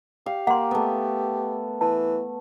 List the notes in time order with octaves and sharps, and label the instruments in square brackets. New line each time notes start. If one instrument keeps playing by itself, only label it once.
[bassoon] G4 [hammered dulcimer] F5
[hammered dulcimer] A#3 [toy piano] F#5 C6
[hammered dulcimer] A3 B3
[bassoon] E3 [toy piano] A5